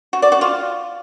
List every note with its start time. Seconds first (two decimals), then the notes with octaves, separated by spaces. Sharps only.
0.13 F#4
0.22 D5
0.32 F#4
0.41 F4